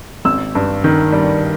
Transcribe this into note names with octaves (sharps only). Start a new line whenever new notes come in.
G#1 E6
G2
D#3
G3